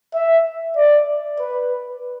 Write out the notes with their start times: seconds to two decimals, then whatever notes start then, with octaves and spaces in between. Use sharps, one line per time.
0.14 E5
0.76 D5
1.40 B4